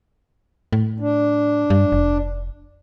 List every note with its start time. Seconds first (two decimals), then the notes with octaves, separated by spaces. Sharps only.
0.73 A2
1.00 D4
1.70 G2
1.92 F1